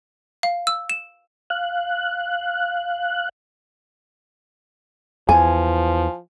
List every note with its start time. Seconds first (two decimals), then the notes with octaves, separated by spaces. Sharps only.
0.43 F5
0.67 E6
0.90 E7
1.50 F5 F#6
5.29 E2 F3 G#5